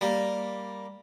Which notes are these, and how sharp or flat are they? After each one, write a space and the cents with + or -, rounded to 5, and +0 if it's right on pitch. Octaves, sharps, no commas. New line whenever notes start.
G3 +0 A#3 +0